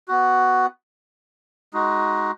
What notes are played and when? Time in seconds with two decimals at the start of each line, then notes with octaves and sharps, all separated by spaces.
0.08 B3 F#4
1.74 G#3 D#4 F#4